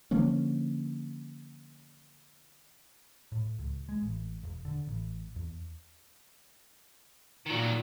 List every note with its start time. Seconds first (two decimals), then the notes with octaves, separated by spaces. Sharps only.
0.11 D3 F3 A#3 C#4
3.32 A2
3.59 C#2
3.89 G#3
4.02 A1
4.43 E1
4.65 D3
4.87 A1
5.36 E2
7.46 A#2 D#3 F#3